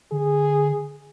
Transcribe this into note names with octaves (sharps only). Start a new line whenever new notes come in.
D3 G#4